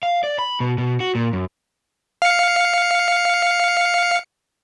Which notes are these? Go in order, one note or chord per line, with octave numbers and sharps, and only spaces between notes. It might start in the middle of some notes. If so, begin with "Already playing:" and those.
F5
D5
B5
B2
B2
F#4
A#2
F#2
F5 C#7